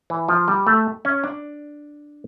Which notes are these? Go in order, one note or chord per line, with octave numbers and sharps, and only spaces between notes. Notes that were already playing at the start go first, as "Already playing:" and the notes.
E3
F3
G3
A3
C#4
D4